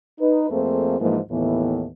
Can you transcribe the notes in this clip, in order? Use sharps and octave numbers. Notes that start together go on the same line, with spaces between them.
D#4 B4
F2 A3 A#3 C4 G#4 C5
G#2 E3 F3 A#3
D#2 A2 E3 B3